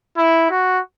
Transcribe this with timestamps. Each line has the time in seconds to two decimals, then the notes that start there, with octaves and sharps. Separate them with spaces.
0.17 E4
0.50 F#4